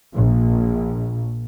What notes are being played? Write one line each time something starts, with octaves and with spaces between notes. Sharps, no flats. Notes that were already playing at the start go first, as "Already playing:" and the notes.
A#1